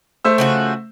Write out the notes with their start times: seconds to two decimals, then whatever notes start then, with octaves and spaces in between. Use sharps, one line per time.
0.25 A3 C5 E6
0.38 C#3 F3 F#4